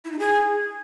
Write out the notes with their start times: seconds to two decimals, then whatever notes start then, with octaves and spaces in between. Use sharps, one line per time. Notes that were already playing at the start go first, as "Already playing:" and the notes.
0.05 E4
0.12 D#4
0.19 G#4